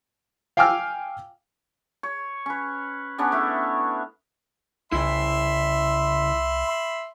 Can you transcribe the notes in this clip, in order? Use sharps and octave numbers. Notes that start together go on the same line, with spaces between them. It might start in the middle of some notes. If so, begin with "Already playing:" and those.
F5 G5 G#5 D6 E6 F6
C#5
C#4 B4
B3 C#4 D4 C#5
A3 E4
C2 C#3 E4 E5 B5 C6